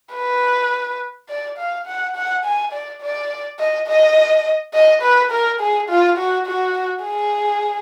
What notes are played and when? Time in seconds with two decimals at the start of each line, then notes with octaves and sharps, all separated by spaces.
0.14 B4
1.29 D5
1.58 F5
1.87 F#5
2.16 F#5
2.45 G#5
2.72 D5
3.02 D5
3.59 D#5
3.88 D#5
4.74 D#5
5.02 B4
5.31 A#4
5.60 G#4
5.89 F4
6.18 F#4
6.46 F#4
7.03 G#4